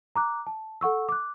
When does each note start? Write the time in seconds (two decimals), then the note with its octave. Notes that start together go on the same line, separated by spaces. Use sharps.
0.16 A#5 D6 F#6
0.47 A5
0.81 A4 F#5 C#6 E6
1.09 D6 F#6